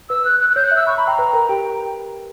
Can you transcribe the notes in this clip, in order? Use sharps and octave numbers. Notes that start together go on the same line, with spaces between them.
B4 E6
F#6
F#6
F#6
C#5 G6
E5 F#6
E6
B5 C#6
A#5 B5
G5 A#5
B4
A#4
G4 G5